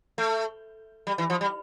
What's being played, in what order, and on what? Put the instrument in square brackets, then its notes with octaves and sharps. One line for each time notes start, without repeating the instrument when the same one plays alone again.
[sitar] A3
G3
E3
F3
G3